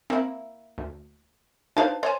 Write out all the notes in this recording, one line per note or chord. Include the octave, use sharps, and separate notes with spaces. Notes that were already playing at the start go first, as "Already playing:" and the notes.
A#3 C4 E4
D2
D4 D#4 B4 C5 F5 A5
C5 C#5 G#5